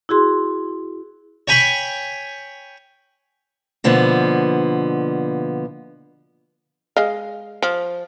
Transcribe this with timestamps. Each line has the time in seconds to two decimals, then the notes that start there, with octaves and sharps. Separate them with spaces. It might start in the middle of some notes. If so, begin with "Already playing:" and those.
0.09 E4 F#4 G#4 C6
1.48 C#5 G5 G#5 B5 C#6
3.84 B2 D3 F3 A#3 B3
6.97 G#3 D#5 F5
7.63 F3